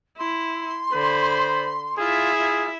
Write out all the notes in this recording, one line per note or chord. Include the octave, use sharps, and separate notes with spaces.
E4 C6
D3 C5 B5
E4 F4 G#4 E5
F4